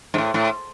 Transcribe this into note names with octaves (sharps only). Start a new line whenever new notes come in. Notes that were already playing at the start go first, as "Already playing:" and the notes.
G#2
A2
A2